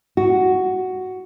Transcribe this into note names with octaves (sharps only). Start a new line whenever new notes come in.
F#4